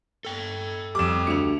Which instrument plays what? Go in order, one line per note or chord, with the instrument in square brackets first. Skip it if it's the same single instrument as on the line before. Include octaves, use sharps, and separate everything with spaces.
[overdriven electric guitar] A4 G5
[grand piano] F2 G3 [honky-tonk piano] D6 E7
[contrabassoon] D2 [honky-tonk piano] C#7 F7